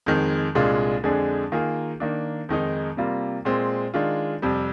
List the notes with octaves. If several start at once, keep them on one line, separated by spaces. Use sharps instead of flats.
F2 D#3 G#3
C2 A#2 G#3 D4 F4
F2 D3 G#3 D4 G#4
D#3 A#3 F4 G#4
D#3 A#3 D4
F2 D#3 G#3 D#4
C3 G3 A#3 F4
A#2 G#3 C4
D#3 G#3 D4 F4
F2 C3 G3